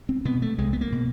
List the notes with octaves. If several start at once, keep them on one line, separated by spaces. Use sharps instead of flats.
C4
B2 B3
A3
C2 G#3
B3
A#3
B2